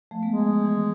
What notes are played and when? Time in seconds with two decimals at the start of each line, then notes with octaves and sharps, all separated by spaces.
0.11 F3 A3
0.23 G#3 B3
0.33 G#3
0.47 F3
0.61 E3